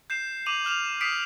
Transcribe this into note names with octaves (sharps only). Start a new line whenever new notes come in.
G6 C7 E7
D6 D#7 F7 F#7
D6 F6 E7 F7
D#6 B6 C7 D7